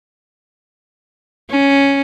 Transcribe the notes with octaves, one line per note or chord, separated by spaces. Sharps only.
C#4